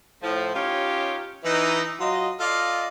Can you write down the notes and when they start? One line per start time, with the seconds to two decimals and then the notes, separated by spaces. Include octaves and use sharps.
0.22 A2 F3
0.54 C#4 D#4 F4 G4 C#5
1.44 E3 D#4
2.01 F#3 F4 D#5
2.40 F4 A4 D5 D#5 F5